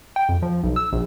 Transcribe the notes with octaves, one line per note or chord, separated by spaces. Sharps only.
G5
F2
F3
B1
E6
A#1